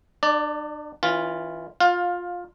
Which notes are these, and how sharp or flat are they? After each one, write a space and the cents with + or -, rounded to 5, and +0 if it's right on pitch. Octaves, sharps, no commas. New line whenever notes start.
D4 +40 D5 +0
E3 -20 C#4 +0 F4 +0
F4 +15 F5 +25